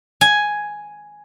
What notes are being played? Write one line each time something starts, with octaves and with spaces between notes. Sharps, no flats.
G#5